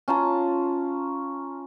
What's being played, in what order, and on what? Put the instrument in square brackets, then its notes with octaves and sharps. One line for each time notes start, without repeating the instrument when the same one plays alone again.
[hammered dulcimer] C#4 F4 A5 A#5